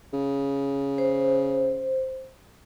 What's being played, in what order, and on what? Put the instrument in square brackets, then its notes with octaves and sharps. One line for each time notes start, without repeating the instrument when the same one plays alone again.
[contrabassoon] C#3
[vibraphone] C5